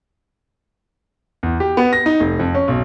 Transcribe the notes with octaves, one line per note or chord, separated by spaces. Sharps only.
E2
G4
B3
A#6
D#4
F1
F2
C#4
B1